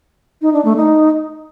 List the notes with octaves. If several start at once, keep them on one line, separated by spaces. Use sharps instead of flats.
D#4
D4
A3
D#4